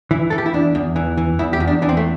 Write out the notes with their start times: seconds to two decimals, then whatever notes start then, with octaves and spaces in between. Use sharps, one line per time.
0.11 E3 E4
0.30 E3 A4
0.38 G4
0.46 E4
0.53 E2 D4
0.75 E2
0.96 E3
1.17 E3
1.39 E2 E4
1.53 G4
1.60 E2
1.67 D4
1.82 E3 D4
1.89 C4
1.97 A3